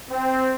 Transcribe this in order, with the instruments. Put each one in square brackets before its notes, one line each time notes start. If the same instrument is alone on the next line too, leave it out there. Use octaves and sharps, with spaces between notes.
[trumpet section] C4